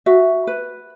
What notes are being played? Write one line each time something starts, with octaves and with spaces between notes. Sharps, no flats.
F#4 E5
B4